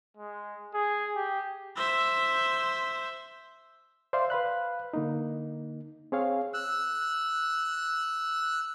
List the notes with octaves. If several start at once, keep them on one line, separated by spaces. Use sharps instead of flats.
G#3
G#4
G4
C5 E5
C5 D5 E5 F5 C6
B4 F5 B5 F#6
D3 A#3 D#4
C4 G#4 C#5 F5
E6 F#6